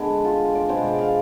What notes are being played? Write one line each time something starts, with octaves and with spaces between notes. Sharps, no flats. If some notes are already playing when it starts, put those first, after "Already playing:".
Already playing: D3 G#3 B3
F4
D5
B2 G#3 D4 C5
D5
F5